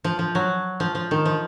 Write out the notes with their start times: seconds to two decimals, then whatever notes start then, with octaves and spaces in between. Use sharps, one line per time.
0.04 F3
0.19 F3
0.35 F#3
0.80 F3
0.95 F3
1.11 D#3
1.25 F3